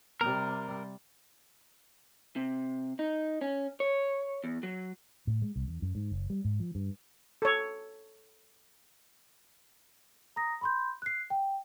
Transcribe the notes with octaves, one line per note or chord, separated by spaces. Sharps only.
C3 G3 A#4
C3
D#4
C#4
C#5
E2
F#3
A2
G#3
C2
E2
F#2
G#2
F#1
G3
G#2
F3
G2
A4 C#5
A#5 D#6 A#6
B5 C6 G6
F#6 C7
G5